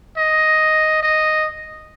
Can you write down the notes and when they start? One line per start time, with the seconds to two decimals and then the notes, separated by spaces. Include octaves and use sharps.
0.17 D#5
1.03 D#5